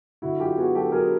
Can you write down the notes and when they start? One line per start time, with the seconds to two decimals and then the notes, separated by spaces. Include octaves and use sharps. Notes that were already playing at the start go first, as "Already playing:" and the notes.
0.22 D3 E4 F#4
0.40 F#3 F4 G4
0.58 B3 F#4 G#4
0.75 F#3 G4 A4
0.92 F#3 G#4 A#4